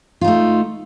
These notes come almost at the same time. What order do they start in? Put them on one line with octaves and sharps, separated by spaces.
F4 D#4 A3